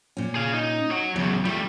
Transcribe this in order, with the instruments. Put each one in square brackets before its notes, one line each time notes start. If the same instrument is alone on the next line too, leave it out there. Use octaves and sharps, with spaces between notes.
[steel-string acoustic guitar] A#2 C#4
[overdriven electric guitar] G#4 F5
D#4
C#5 F#5
[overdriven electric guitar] E2 C#3 [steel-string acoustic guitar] F#3
[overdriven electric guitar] G3 A3 [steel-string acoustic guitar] F4